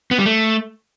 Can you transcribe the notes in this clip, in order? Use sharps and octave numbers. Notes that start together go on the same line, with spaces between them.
B3
G3
A3